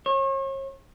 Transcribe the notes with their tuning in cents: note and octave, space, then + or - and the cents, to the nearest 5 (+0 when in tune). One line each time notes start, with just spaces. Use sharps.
C#5 -40